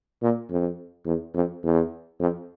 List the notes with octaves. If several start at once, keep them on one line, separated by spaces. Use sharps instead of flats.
A#2
F2
E2
F2
E2
F2